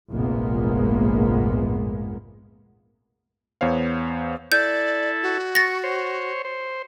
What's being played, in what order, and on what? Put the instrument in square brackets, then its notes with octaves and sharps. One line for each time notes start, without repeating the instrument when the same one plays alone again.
[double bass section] F1 A#1 G#2 G#3 A#3 B3
[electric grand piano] E2 B3 C5 C#5 F5
[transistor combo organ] E4 A4 [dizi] D5 [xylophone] G6
[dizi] F#4
[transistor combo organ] C#6 [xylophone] A6 A#6
[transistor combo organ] C5 C#5
C5